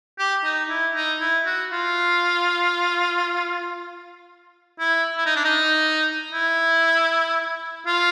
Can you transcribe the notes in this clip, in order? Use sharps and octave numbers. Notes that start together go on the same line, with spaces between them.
G4
D#4
E4
D#4
E4
F#4
F4
E4
E4
D#4
D4
D#4
E4
F4